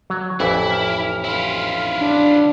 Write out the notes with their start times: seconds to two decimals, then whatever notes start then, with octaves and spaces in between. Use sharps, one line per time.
0.10 F#3
0.40 A1 F2 E3 E4
0.70 F6
1.24 E4 F4
2.00 D4